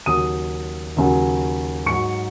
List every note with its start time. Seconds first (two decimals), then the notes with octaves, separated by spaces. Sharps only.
0.06 D#2 C#3 F#3 D#6 D#7
0.97 D#2 C#3 F#3
1.86 G#2 F#3 C#6 C#7